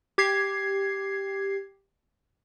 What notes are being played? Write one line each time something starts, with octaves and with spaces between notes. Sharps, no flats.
G4 G#6 C7